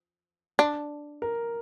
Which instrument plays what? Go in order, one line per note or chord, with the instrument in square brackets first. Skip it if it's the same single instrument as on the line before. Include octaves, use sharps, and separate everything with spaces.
[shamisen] D4
[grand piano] A#4